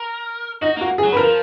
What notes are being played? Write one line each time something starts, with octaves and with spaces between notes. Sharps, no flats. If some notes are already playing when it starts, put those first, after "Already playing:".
Already playing: A#4
D#4 F#4
A#3 F#4
G#4
F#3
B4
F3 A#4